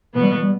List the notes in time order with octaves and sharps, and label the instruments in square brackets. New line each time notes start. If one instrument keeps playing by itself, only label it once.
[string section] B2 B3 [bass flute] E3
[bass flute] G3
E3
G3